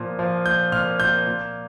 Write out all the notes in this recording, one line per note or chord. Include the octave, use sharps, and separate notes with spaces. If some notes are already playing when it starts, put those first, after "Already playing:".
Already playing: A#2 F3
F3
A#2 G6
A#2 F6
A#2 G6
A#2